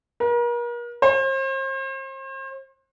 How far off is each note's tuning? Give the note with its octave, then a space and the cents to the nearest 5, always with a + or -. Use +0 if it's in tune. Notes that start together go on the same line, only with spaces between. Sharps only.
A#4 +40
C5 +40